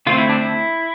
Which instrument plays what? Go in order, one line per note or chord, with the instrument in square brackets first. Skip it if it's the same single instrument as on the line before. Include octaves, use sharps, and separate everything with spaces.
[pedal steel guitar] D3 A3 C4 F4
E4
D4
E4